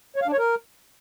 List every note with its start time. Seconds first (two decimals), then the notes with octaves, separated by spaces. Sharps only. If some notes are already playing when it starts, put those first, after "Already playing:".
0.16 C#5
0.22 F5
0.27 D4
0.33 C#5
0.38 A#4